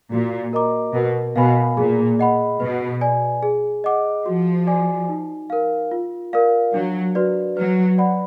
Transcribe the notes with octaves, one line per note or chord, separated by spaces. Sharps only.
A#2 F#4
A#4 D#5 A#5 D6
B2 A#4
B2 F5 G#5 B5
A#2 G#4
D#5 F#5 B5
B2 B4
D5 G#5
G#4
D#5 F#5 D6
F3 F#4
D5 G#5 D6
D#4
A#4 F5
F4
A#4 D5 F5
F#3 D4
F#4 B4 D5
F#3 B4
D5 F#5 B5